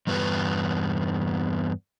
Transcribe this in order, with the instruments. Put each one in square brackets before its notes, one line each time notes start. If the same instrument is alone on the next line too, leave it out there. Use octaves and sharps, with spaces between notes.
[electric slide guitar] E2 G2 B3